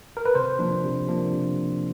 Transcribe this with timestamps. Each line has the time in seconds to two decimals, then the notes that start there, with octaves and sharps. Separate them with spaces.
0.17 A#4
0.26 B4
0.35 C3 C5
0.59 F3 A#3 D4
0.84 C3
1.08 F3 A#3 D4
1.32 C3